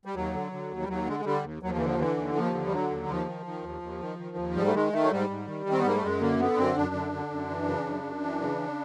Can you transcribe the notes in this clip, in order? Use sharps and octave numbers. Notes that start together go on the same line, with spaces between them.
G3
D#2 F#3
D3
D3
D#2
G3
D#2 F#3
D3 G#3
G#3
D3 G3
D#2
D#2 F#3
F3
D3 E3
F3
D3 E3
D#2
D#2 F3
D3
G3
D3 F#3
D#2
D#2 F3
D#3
D#3
D#2
D#2
D#3
D#3
D#2
G#2 G3
A3
D#3 G#3
D#3 A3
F#3
G#2 G3
G#2
D#3
D#3
C4
B3
G#2 A#3
A3
F#2 G#3
D3 A#3
D3 B3
F#2 C4
F#2 D4
D3
D3
F#2
E3
C#3
F#2
F#2
E3
C#3